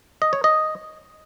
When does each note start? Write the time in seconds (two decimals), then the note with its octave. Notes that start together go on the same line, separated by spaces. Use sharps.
0.22 D#5
0.33 C#5
0.44 D#5